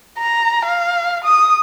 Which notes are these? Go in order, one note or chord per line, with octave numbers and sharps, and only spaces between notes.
A#5
F5
D#6